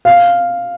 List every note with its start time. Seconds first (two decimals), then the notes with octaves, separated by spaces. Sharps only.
0.05 F5